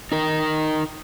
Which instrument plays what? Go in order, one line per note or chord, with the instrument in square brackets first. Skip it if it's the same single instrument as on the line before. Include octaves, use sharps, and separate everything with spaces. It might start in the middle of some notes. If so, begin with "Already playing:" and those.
[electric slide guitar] D#4 A#4